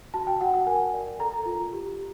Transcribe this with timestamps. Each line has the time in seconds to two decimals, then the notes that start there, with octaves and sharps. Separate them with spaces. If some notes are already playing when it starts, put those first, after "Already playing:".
0.14 F#4 A5
0.27 G5
0.41 F#4 F#5
0.54 F#5
0.66 A#4 G#5
0.93 D5
1.19 A4 A#5
1.46 F4
1.73 G4